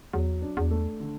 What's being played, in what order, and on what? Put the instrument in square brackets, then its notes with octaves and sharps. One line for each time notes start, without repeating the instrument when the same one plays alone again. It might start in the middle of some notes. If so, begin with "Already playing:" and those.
[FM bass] E2 [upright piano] F#3
[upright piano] D4
[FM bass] E2
[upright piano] A3
D3